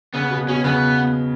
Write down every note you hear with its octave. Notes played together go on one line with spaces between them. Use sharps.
C#3 B3
B2
B2 C#4
C#3 B3